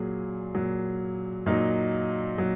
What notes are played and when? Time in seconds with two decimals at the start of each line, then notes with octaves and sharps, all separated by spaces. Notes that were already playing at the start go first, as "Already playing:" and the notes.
Already playing: A#2 F#3 G#4
0.55 A#2 F#3
1.46 A#2 F#3 D#4
2.38 A#2 F#3